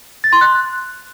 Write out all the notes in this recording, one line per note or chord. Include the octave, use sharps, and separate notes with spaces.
A6
C6
F#6